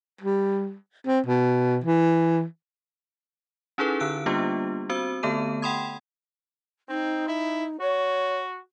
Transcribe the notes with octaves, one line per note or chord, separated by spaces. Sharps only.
G3
C4
B2
E3
C#4 D#4 E4 G#4 A4 B4
D3 E6 F#6 D7
G3 A#3 B3 D4 F4 G4
C4 F#4 C5 E6
D3 A3 B3 A4 A5 D#7
F#5 G5 B5 C6 D#6 G#6
C4 D#4
E4
F#4 C#5